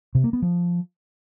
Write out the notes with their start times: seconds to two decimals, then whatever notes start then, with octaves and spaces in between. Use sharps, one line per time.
0.15 C3
0.24 A#3
0.33 B3
0.42 F3